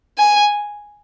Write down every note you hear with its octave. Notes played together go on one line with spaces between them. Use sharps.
G#5